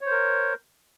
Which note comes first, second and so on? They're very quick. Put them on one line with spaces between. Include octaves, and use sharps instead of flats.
C#5 C5 A#4